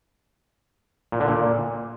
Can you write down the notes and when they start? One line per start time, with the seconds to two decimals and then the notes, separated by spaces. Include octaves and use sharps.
1.12 A#2
1.20 D3
1.28 A#2